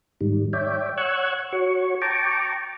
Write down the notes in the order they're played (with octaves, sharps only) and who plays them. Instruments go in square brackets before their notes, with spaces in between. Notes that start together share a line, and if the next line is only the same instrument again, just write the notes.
[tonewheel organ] G#2 D#3 G3
C#5 D5 E5 G5
C#5 F#5 C#6 E6 F#6 G#6
F#4 C#5 C#6
G5 A5 A#5 C#6 D6